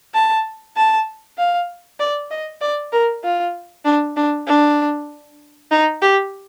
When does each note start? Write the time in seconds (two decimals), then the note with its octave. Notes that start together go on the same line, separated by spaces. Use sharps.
0.14 A5
0.77 A5
1.38 F5
2.00 D5
2.31 D#5
2.61 D5
2.92 A#4
3.24 F4
3.85 D4
4.17 D4
4.47 D4
5.71 D#4
6.02 G4